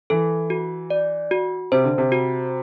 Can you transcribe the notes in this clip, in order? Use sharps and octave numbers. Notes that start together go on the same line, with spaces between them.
E3 A4
F#4
D5
F#4
C3 C5
D3
C3
F#4